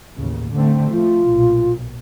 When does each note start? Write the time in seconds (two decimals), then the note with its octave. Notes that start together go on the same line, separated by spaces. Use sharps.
0.17 A1 D#2 C#3
0.53 D3 A3 C4
0.92 F3 A3 F4
1.24 B1 A#2